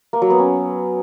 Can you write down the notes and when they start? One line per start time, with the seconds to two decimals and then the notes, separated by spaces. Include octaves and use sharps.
0.13 A#3
0.22 F#3
0.30 B3
0.39 C#4